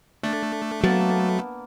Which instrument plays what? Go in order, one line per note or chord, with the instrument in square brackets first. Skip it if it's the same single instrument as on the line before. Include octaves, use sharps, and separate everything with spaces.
[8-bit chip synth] A3 [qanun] D4
[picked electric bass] F#3 [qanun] A#3 B3 A5